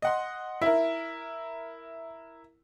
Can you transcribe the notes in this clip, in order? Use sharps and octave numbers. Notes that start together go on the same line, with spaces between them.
D#5 F#5 C6
E4 A#4 E5